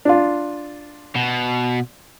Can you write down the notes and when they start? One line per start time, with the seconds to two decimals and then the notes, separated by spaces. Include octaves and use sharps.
0.05 D4 F4
1.15 B2